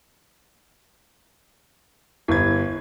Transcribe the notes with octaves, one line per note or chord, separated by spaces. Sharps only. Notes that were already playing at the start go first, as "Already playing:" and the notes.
G1 E4 G#6